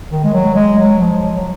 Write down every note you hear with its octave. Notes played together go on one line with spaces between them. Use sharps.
D#3
G#3
F#3
G#3
F#3
F3
F#3